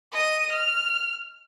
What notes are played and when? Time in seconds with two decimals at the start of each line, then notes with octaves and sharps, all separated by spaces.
0.12 D#5 D#7
0.53 F6